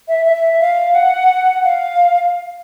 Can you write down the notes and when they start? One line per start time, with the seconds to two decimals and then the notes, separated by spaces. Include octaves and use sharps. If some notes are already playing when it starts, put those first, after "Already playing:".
0.08 E5
0.26 E5
0.61 F5
0.95 F#5
1.64 F5